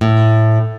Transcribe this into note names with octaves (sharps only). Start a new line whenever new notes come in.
A2